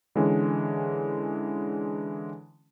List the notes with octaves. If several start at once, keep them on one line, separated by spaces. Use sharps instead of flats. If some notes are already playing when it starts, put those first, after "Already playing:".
D3 E3 G#3 C#4